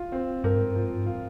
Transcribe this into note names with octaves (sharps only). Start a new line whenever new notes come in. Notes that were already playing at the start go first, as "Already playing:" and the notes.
Already playing: F4
C4
G2 A#4
G#2
G2
G#2 F3
G2
G#2 F4